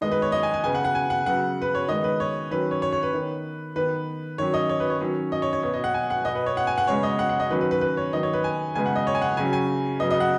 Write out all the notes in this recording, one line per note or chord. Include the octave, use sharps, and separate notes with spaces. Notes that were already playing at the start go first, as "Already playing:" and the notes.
D#3 G#3 B3 D#5
B4
C#5
D#5
G#5
G#5
C#3 B3 G#5
F#5
F#5
G#5
F#5
C#3 F#3 B3 F#5
B4
C#5
D#3 G#3 B3 D#5
B4
C#5
D#3 F#3 C#4 B4
C#5
C#5
C#5
B4
D#3 B3
D#3 B3 B4
D#3 F#3 C#4 C#5
D#5
C#5
B4
C#5
D#3 F#3 C#4
D#5
C#5
C#5
B2 B3 C#5
D#5
F#5
G#5
F#5
B2 B3 D#5
B4
C#5
F#5
G#5
F#5
C#3 G#3 B3 C#5
D#5
F#5
F#5
D#5
D#3 F#3 C#4 B4
B4
B4
B4
C#5
D#3 F#3 B3 D#5
C#5
B4
G#5
C#3 G#3 B3 G#5
F#5
D#5
C#5
G#5
F#5
C#3 F#3 C#4 G#5
G#5
C#3 F#3 B3 D#5
D#5
F#5